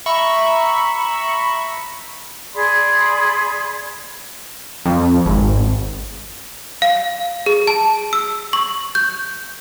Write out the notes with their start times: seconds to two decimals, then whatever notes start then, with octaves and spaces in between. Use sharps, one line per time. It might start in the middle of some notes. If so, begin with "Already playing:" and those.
0.06 E5 A#5 B5 C#6
2.54 G#4 D5 B5 C6
4.86 F2
5.26 G#1
6.82 F5
7.46 G#4
7.67 A5
8.13 E6
8.53 C#6
8.95 G6